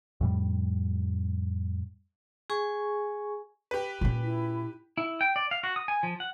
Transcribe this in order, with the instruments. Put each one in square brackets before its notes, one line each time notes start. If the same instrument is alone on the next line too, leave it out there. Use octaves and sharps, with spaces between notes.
[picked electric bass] F2 A2 G3
[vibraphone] G#4 G#5 C#6
[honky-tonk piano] G4 B4
[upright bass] A#2 C#4
[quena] E4
[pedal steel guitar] E4
G5
D5
F5
F#4
D#6
G#5
F3
F#5